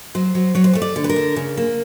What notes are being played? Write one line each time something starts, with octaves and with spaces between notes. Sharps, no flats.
F#3 C5
F#3
F#3 C#5
C5
A3 C#5
D5
D3
B4
A#4
D3
C#3
A#3